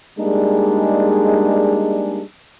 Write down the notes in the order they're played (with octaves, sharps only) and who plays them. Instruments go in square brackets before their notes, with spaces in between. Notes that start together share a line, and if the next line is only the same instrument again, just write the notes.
[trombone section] G3 G#3 A#3 D4 D#4 G#4